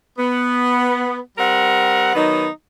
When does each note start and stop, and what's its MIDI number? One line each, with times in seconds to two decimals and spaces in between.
0.18 1.19 59
1.38 2.14 55
1.38 2.14 60
1.38 2.14 70
1.38 2.14 78
2.15 2.47 51
2.15 2.47 54
2.15 2.47 59
2.15 2.47 63